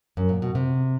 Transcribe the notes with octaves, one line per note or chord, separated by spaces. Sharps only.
F#2
A#2
B2
C3